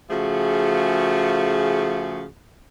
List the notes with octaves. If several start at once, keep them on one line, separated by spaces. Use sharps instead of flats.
C#3 F3 A3 F#4 G#4